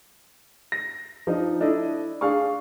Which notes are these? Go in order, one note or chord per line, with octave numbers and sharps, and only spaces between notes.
A#6
F3 D4 D#4
D4 E4 A4 D#5
D4 G#4 F5 C#6